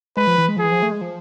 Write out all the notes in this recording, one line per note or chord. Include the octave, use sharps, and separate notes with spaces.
G#3 B4
F3
E3
G#3
F3
E3 G#4
F3
A3
G#3
F3